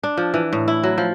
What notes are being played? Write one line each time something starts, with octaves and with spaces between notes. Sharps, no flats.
D4
F3
E3
A2
E4
F#3
F3